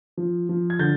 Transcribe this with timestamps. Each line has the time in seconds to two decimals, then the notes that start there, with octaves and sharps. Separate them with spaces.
0.17 F3
0.49 F3
0.70 G#6
0.79 D3 G6 A6